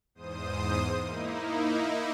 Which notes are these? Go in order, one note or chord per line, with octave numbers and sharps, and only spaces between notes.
E2 G#2 C5 D#6
A#3 D#4 E4